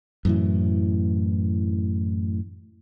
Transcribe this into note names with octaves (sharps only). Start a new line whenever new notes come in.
F#2 A2 E3